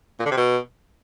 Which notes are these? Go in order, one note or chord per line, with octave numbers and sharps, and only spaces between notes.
A#2
D3
C3
B2